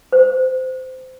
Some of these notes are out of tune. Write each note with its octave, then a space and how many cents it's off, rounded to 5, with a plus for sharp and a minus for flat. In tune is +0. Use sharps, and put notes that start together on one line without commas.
C5 -20